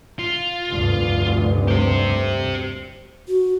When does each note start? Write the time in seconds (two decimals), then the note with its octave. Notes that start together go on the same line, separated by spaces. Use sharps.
0.19 F4
0.69 F1 D2 G2
1.68 G4 C5
3.28 F#4